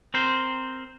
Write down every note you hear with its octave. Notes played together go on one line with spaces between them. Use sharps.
C4 A#4 C5